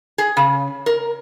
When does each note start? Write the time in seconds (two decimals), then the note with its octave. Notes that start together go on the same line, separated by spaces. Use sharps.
0.18 G#4
0.37 C#3
0.86 A#4